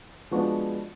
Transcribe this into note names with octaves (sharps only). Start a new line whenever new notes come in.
F3 G#3 B3 D4 F#4